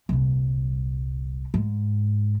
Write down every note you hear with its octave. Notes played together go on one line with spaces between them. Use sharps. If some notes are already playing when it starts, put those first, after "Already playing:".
D#1 C2
G#2